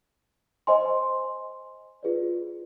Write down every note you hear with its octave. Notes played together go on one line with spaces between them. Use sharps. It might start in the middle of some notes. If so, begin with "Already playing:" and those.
C5 D#5 G#5 C6
F4 G#4 B4 D5